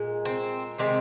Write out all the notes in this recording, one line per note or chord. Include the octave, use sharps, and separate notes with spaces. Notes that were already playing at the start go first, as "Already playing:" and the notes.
Already playing: A#2 G#3
C4
C3 D#3 G#3 C4